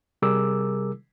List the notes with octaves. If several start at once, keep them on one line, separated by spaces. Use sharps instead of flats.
C3 G3 G#4 A#4 D6 E6